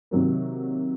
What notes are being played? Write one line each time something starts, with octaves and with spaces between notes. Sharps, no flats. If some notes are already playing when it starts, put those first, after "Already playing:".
C3 D#3 F#3 A#3